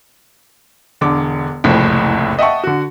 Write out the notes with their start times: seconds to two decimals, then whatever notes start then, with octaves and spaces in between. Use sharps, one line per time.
1.01 E1 D3 D6
1.64 F#1 C2 F2 A2 F3
2.39 D#5 E5 F#5 G5 A5 C#6
2.64 D3 F#4